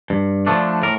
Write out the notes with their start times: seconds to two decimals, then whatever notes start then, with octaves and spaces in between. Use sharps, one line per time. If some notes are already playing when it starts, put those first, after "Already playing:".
0.10 G2
0.47 D3 F3 A3 D4
0.83 A2 A#4